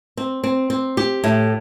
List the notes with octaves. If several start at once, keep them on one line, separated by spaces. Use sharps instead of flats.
C4
C4
C4
G4
A2